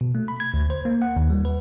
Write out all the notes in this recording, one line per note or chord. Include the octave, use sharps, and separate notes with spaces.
B2
A3
B5
G#6
D2
C5
A#3
F#5
D#2
G3
B4